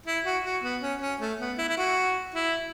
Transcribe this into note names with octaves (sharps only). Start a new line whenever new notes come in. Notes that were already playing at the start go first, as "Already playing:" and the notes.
E4
F#4
F#4
B3
C#4
C#4
A3
B3
E4
E4
F#4
E4